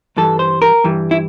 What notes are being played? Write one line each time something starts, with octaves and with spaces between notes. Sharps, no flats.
G2 E3 G3 A4
C5
A#4
G2 E3 G3
E4